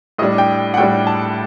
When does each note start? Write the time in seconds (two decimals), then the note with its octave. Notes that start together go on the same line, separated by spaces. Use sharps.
0.18 A2 G3 D4 D#5
0.38 G5
0.74 F#5
0.77 A2 G3 D4 G5
1.07 A5